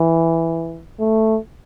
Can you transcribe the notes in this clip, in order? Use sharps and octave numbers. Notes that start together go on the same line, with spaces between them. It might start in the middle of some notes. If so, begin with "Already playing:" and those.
Already playing: E3
A3